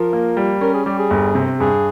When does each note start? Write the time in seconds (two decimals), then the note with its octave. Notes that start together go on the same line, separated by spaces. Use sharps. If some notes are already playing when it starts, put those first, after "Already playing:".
Already playing: F3 A#4
0.13 A#3
0.37 G3
0.61 C#4 A#4
0.74 G#4
0.85 G3 G4
0.98 G#4
1.10 G1
1.35 C3
1.60 G2 G#4